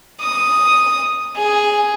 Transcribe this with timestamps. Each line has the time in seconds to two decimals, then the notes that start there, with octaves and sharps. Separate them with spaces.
0.20 D#6
1.36 G#4